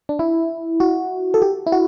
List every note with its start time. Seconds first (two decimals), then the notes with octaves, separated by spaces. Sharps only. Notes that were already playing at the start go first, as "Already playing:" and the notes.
0.09 D4
0.19 E4
0.80 F#4
1.34 A4
1.42 G4
1.67 E4
1.72 F#4